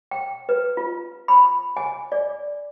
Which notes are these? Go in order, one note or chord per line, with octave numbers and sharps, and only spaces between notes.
G5
B4
F4
B5
G#5
D5